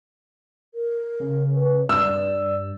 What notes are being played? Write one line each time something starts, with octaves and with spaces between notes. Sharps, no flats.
A#4
C#3
B4
G2 D5 E6